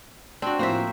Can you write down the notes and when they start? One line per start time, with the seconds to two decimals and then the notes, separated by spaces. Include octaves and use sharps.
0.42 C4 D4 F#4
0.59 A2 F3 A#3 C4 C5 E5